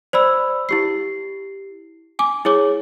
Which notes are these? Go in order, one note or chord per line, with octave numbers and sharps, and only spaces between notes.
C5 D5 B5 E6
E4 G4 C7
G#5 D6
E4 G#4 C#5 D6